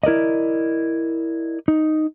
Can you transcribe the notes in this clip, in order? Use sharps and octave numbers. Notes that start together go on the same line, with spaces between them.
E4 A#4 D5 D#5
D#4